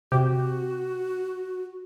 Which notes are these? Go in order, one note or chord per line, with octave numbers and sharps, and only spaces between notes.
C3 F#4 G4